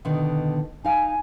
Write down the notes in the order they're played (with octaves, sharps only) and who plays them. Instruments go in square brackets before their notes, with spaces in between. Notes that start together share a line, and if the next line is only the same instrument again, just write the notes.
[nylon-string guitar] B2 D3 D#3
[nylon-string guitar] D#4 F5 [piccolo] G#5